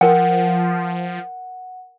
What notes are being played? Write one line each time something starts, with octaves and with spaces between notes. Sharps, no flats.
F3 A#4 F#5 G5